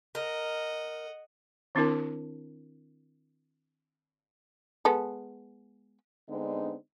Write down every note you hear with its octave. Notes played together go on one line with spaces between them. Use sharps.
A#4 D#5 F#5
D#3 C4 D4 E4 A#4 A5
G#3 B3 A4
D3 G#3 B3 C4 D4 D#4